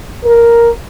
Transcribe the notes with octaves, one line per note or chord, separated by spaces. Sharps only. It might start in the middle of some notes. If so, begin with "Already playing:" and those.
A#4